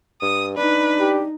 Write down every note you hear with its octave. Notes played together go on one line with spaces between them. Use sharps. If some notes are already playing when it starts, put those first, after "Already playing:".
G2 D#6
D4 D#4 B4
G4